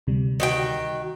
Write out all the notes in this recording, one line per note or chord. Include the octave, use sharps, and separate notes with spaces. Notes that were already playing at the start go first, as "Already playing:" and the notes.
D2 C3 G3
D#3 F#4 G5